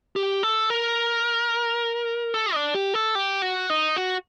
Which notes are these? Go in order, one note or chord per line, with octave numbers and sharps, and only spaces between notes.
G4
A4
A#4
A4
D4
G4
A4
G4
F#4
D#4
F#4